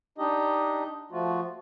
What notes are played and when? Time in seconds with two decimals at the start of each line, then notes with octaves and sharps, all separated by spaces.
0.18 D4 D#4 G4 D#5
1.11 F3 A3 F4 F#4